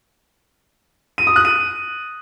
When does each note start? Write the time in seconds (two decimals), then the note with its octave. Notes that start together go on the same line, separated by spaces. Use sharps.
1.18 D#7
1.27 D#6
1.36 F#6
1.45 D#7